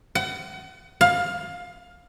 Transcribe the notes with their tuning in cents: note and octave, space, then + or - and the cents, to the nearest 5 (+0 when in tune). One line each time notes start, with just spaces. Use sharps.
F#5 +35
F5 +20